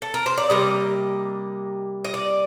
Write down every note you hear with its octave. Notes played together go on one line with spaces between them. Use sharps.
A4
A#4
C5
D5
C3 G3 A#3 D#5
D#5
D5